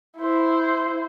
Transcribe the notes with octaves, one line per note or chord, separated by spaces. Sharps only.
E4 C5